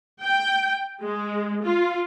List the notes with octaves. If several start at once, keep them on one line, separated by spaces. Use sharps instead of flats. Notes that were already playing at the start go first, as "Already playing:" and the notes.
G5
G#3
F4